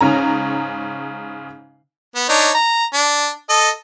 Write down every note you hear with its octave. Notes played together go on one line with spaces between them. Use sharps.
G#2 C#3 C#4 A#5
B3
D4 D#4 C#5
A#5
D4
A4 D#5